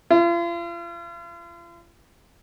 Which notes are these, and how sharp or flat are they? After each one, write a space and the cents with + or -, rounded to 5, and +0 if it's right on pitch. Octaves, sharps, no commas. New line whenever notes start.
F4 -40